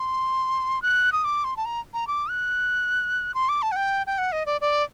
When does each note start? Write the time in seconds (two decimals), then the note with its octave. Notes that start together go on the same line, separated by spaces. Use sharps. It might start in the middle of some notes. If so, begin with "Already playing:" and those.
Already playing: C6
0.82 F#6
1.12 D#6
1.24 D6
1.44 C6
1.57 A5
1.65 A#5
1.94 A#5
2.07 D6
2.30 F#6
3.34 C6
3.49 D6
3.62 A5
3.72 F#5
3.76 G5
4.07 G5
4.18 F#5
4.32 D#5
4.46 D5
4.61 D5